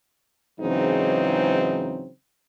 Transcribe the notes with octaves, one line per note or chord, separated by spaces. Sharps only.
G#2 C#3 E3 F#3 C4 D#4